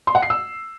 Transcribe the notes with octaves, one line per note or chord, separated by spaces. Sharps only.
C6
F#5
C7
E6